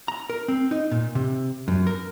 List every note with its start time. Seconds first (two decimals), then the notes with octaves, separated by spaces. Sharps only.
0.08 A#5
0.30 A#4
0.48 C4
0.71 D#4
0.91 A#2
1.15 C3
1.68 F#2
1.87 A#4